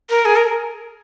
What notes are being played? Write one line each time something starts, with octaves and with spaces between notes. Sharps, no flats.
A#4
G#4
A#4